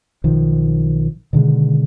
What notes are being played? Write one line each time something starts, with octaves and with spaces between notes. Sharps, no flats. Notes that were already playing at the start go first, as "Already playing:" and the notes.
B1 D#3 F3
B2 D3 D#3 G#3